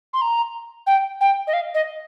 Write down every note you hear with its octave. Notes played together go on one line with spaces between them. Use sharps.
C6
A#5
G5
G5
D#5
F5
D#5